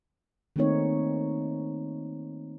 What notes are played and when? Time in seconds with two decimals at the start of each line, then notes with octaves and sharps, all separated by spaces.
0.56 D#3 A3 A#3 C4 D#4 C#5